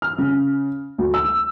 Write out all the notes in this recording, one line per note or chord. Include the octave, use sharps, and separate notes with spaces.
F6
C#3
D2
E6